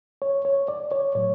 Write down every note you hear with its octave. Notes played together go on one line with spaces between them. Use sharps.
C#5
C#5
D5
C#5
A2 F#3 C#5